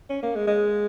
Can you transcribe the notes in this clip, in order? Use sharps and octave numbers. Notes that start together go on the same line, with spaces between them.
C#4
A#3
G#3
G#3